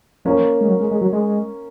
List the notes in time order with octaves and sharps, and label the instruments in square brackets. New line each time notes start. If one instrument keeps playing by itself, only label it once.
[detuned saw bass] F3 [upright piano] A#3 C#4
[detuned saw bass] G#3
F#3
G#3
G#3
F#3
G#3